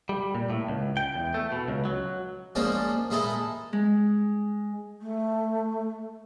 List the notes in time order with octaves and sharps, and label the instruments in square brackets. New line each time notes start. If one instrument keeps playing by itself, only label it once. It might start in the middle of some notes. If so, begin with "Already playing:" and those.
[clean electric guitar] G3
A#2
A2
C#2
G5
E2
A3
B2
C#2
F#3
[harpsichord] F3 G#3 A#3 C#4 D4 D5
A#2 G#3 D#4 E4 A4
[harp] G#3
[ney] A3